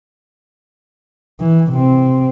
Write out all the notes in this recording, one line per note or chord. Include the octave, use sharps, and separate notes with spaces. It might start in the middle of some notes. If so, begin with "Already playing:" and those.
E3
C3 C4